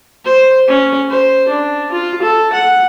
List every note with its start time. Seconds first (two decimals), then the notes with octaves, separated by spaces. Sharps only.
0.25 C5
0.68 C#4
1.09 C5
1.48 D4
1.92 F4
2.22 A4
2.53 F#5